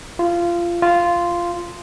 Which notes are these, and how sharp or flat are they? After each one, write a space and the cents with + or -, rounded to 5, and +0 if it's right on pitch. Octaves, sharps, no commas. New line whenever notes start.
F4 -20
F4 -10